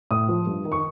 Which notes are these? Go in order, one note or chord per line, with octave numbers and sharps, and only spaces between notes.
A2 D#6
F3
G2
D#3
C#6